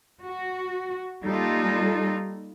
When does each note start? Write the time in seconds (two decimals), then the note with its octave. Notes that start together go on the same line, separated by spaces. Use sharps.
0.24 F#4
1.23 G3 A#3 D#4 F4 A4